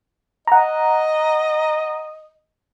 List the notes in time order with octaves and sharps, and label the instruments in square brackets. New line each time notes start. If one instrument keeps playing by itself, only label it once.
[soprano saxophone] D#5 [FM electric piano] F#5 A#5